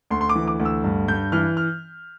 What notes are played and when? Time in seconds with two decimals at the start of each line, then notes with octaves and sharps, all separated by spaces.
0.11 D2 C6
0.21 C6
0.29 D6
0.35 E3
0.47 D6
0.60 D2
0.65 E6
0.84 G2
1.08 G2 G6
1.32 E3 F6
1.57 F6